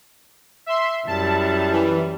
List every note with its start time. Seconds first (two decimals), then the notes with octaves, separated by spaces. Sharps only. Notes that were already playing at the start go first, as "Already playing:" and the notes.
0.66 E5 C6
1.07 F#2 G3 E4 A5
1.71 E3